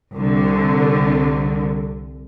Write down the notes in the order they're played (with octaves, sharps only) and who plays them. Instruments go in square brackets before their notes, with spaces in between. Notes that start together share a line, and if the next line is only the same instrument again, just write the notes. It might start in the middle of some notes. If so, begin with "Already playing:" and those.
[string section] C2 D3